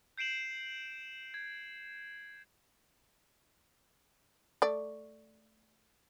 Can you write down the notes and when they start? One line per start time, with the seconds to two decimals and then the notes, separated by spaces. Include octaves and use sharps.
0.18 G6 C7 D7 E7 F#7
1.34 G#6
4.62 A3 D5